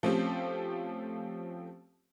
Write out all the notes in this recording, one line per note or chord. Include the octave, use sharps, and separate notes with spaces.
F3 A3 C4 C#4 G4